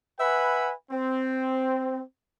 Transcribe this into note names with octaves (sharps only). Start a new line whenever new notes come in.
B4 E5 F#5 G#5 B5
C4